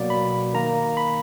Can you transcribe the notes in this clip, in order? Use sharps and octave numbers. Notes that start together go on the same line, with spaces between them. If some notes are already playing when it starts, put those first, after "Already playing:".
Already playing: B2 F#3 A#3 D5
B5
D#3 A#3 A#5
B5